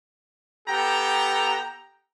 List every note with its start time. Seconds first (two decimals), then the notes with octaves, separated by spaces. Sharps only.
0.68 B3 G4 A4 G5 A#5